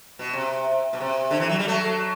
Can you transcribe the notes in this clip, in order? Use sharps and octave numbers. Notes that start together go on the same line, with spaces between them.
B2
C3
B2
C3
D3
E3
F#3
G3
F#3 A3